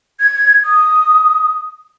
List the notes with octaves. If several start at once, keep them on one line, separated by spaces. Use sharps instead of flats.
G#6
D#6